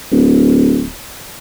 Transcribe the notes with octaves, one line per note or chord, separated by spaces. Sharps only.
D1